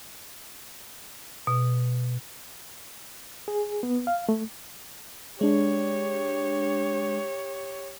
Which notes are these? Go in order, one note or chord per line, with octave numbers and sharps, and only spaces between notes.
B2
G#4
B3
F5
A3
G#3 D4 G4 C#5